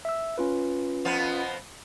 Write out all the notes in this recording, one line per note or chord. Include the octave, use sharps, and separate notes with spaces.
E5 E6
C#4 F4 B4
F2 F3 B3